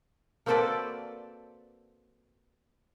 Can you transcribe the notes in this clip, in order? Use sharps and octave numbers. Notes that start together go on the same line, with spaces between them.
A#3 C4 F#4 A4 B4 D5